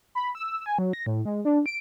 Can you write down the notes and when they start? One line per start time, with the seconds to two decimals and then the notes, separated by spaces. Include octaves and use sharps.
0.15 B5
0.35 E6
0.66 G#5
0.79 F#3
0.93 A#6
1.06 A2
1.25 G#3
1.45 D4
1.66 D7